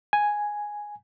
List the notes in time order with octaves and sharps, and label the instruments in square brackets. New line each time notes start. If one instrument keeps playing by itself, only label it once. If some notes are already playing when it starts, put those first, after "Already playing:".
[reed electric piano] G#5